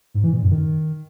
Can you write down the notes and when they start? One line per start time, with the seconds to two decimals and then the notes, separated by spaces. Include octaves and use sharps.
0.15 G#2
0.24 E3
0.33 A#2
0.42 F#2
0.52 D#3